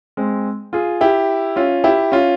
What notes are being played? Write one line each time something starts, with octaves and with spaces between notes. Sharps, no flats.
G#3 C4
F4 G#4
E4 G4
C#4 F4
E4 G4
C#4 F4